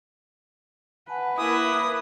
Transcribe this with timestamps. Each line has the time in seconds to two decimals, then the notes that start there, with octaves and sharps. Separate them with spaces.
1.09 B4 F#5 G#5 A5
1.37 A#3 E4 D6 D#6